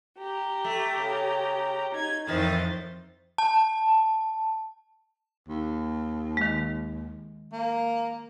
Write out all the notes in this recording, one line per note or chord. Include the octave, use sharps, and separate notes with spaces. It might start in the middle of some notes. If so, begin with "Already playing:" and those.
G4 A#5
A3
C#3
D#4 G#6
F2 A2 D#3 E3 C5 A6
A5
D#2
D#3 G#3
A#3